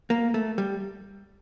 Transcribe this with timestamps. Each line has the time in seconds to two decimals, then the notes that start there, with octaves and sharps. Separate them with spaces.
0.10 A#3
0.34 A3
0.58 G3